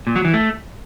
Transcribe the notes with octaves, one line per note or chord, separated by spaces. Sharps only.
A#2
F#3
E3
A3